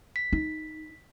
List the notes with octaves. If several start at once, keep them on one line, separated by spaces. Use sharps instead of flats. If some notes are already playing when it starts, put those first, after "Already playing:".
B6
D#4